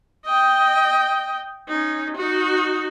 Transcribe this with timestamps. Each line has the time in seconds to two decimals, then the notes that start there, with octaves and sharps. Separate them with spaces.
0.26 D#5 G5
1.68 C#4 D#4
2.17 D#4 F#4